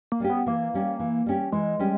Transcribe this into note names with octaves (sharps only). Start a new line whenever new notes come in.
A#3
G3 C#4 G4
B3
E3 A#3
G3 C#4 G4
E3
G3 C#4 G4
E3 G#3
G3 C#4 G4